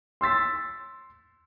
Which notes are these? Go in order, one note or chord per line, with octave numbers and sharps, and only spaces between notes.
C6 E6 A6 B6